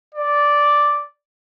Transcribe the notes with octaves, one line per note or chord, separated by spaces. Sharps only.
D5